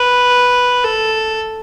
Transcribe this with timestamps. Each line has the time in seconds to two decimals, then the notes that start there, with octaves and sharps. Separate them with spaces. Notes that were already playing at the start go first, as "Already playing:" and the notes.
Already playing: B4
0.84 A4